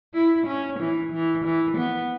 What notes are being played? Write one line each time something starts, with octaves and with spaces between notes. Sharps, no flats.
E4
C#4
E3
E3
E3
B3